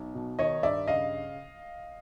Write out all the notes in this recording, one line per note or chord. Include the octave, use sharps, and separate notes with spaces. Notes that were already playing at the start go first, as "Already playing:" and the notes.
Already playing: B1
B2
D#3 C#5 D#5
G2 D5 E5
C#3 D#5 F5